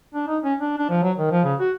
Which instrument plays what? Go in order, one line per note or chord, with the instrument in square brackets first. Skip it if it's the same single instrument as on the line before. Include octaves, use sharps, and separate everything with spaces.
[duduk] D4
D#4
C#4
D4
D4
F3
F#3
D#3
F3
C#3
F#4